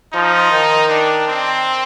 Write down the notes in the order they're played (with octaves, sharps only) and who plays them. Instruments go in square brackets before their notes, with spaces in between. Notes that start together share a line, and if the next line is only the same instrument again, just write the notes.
[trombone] F3 [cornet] D#4
[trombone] D#3
[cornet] D4
C4